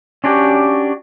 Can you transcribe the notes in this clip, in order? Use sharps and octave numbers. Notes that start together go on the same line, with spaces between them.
C#4 D4 F#4 G4